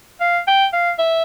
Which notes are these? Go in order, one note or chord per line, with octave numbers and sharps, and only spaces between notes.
F5
G5
F5
E5